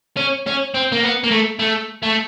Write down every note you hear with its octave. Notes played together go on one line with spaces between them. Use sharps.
C#4
C#4
C4
A#3
B3
A#3
A3
A3
A3